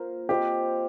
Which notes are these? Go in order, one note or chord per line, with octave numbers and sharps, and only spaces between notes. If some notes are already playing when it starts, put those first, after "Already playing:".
Already playing: A#3 F4 A#4 C5
C4 F4 G4 C5 D#5